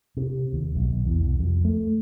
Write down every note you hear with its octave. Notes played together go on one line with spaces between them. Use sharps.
C3
D#2
B1
B1
E2
C2
F2
A3